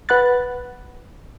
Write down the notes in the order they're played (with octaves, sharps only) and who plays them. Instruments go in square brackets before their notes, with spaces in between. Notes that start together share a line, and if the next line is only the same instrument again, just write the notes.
[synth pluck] B4 F#5 B5 F#6 A6